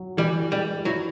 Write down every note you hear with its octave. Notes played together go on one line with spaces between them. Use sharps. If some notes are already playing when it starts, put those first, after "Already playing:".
Already playing: F#3
E3 G3
G3 G#3
F#3 E4